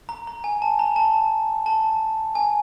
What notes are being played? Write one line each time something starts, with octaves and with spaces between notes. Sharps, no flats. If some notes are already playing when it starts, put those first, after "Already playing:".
A#5
A#5
G#5
A5
A#5
A5
A5
G#5